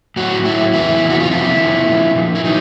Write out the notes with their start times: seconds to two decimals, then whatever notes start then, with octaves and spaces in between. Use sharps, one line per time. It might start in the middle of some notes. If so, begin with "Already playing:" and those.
0.16 A2 F#3 F#4
0.45 A2 F#3 E4
0.73 E2 C3 E3 E4
1.02 E2 C3 E3
1.10 F#4
1.20 F4
1.30 F2 C3 F3 E4
1.59 F2 C3 F3
1.87 A#2
1.92 F3
2.15 A#2 F3
2.35 E4
2.44 D#3 F#3 D#4